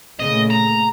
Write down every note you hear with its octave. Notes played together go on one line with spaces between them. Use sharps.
A#2 C#3 A3 D#5
A#5